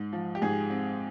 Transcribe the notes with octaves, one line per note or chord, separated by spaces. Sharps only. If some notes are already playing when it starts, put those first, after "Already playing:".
Already playing: G#2
F3
G4
G#2 G#4
C4